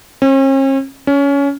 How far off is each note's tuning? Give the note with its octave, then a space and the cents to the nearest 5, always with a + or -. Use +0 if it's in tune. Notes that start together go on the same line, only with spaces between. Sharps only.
C#4 -45
C#4 +20